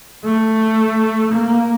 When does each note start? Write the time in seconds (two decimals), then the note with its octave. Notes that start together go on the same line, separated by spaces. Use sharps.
0.24 A3
1.33 A#3